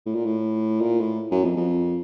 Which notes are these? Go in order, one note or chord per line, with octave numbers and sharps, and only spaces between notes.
A2
A#2
A2
A#2
A2
F#2
F2
F2